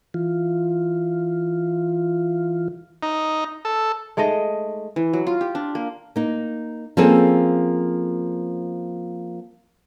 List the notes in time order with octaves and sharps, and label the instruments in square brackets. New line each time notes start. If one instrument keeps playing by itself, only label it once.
[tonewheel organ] E3 F4
[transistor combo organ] D#4
A4
[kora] G#3 A3 D#4 D#5
[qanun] E3
F#3
F4
G4
D4
A#3
[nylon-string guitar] A#3 D#4
F3 A#3 C4 C#4 G#4 A4